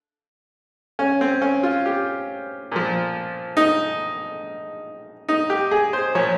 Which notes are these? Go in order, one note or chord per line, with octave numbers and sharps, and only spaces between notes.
C#4
C4
C#4
F4
G4
A#2 F3
D#4
D#4
G4
G#4
C5
A#2 F3 C#5